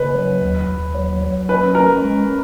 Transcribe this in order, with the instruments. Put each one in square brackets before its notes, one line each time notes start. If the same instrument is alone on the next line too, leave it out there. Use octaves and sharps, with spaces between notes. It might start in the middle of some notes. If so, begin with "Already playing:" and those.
Already playing: [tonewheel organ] C#3 [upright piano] B4
[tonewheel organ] F#3
D#2
D#2
F#3
F#3
[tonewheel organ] C#4 [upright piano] B4
[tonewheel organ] C#4 [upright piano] A#4
[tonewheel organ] G#3